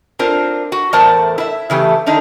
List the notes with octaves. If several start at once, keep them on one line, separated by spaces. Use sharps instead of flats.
C4 D4 F4 A#4 C5
F#4
E2 A2 A#4 C5 D5 A5
E4 E5
C#3 E3 A3 G4
D3 D#3 D4 D#4